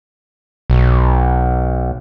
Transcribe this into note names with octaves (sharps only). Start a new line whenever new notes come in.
B1